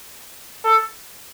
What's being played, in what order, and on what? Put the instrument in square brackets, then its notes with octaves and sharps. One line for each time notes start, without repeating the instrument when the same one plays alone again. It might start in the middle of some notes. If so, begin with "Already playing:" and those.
[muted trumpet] A4